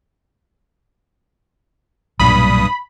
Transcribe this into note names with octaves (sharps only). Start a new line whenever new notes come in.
B1 G2 A#2 F#3 B5 D#6